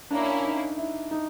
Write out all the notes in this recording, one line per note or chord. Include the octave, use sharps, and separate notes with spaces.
A#3 C#4 D4 E4
D#4
E4
D#4